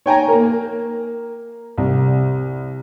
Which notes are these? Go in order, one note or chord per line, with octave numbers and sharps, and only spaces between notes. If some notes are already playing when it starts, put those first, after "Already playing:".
C#5 G5 G#5 A#5
A#3 A#4
C2